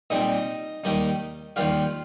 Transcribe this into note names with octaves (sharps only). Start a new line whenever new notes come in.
A#2 G3 C4 D#4 D#5
D#2 D#3 G3 D#4
D#2 D#3 G3 F4 F5